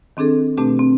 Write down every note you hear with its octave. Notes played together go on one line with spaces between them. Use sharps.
D#3 C4 D4 G#4 A4
B2 A3 C4 D4 G4
C4